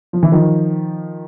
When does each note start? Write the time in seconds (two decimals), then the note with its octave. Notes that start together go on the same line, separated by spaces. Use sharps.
0.13 F3
0.23 E3
0.32 D#3 F3